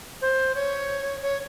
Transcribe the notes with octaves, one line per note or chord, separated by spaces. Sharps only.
C5
C#5
C#5